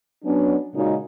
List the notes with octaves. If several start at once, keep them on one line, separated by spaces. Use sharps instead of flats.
F#3 B3 C#4 D4
A#2 C#3 G#3 D#4 F#4